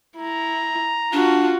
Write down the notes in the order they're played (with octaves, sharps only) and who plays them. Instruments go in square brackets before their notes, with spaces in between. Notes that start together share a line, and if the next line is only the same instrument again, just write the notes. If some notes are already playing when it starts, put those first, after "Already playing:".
[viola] E4 [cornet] A#5
[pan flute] D4 [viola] F4 F#4